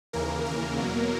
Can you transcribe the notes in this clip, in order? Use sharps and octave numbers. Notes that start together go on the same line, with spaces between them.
D#2 C#3 E3 A#3 A#4
A#3 A#4
E2 B2 F#3